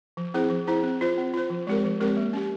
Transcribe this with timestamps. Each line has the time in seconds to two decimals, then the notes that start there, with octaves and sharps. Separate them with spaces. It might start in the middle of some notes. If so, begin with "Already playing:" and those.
0.17 F3
0.34 C4 E4 G#4 C5
0.50 F3
0.67 C4 E4 G#4 C5
0.83 C4
1.01 F4 C5
1.18 C4
1.34 F4 C5
1.50 F3
1.67 G#3 C4 G4 A#4
1.84 F3
2.01 G#3 C4 G4 A#4
2.17 A#3
2.33 C#4 G4